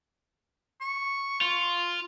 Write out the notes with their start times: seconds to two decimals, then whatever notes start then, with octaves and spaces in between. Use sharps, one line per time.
0.81 C#6
1.41 F4